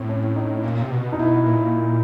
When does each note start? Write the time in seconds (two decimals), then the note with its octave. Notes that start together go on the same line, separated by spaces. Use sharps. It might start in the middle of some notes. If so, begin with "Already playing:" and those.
Already playing: A2 C4
0.09 C#4
0.36 D#4
0.63 A#2
0.82 C3
0.91 B2
1.12 D#4
1.19 B2 E4
1.46 A#2